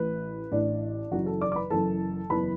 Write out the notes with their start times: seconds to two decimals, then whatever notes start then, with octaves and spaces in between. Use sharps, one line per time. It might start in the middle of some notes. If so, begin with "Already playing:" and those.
Already playing: A1 A2 E3 B4
0.52 A1 A2 E3 D4 D5
1.11 F#1 F#2 E3 F#4 F#5
1.26 A4 A5
1.41 D5 D6
1.52 D6
1.56 B4 B5
1.70 F#1 F#2 E3 A4 A5
2.30 F#1 E2 E3 B4 B5